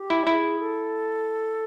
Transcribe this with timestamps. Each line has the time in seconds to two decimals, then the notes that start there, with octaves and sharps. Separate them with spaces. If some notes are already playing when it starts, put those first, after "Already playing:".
Already playing: G4
0.10 E4
0.27 E4 G#4
0.59 A4